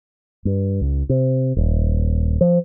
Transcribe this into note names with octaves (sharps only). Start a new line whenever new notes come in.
G2
C#2
C3
D#1
F3